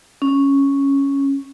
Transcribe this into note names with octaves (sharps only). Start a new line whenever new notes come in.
C#4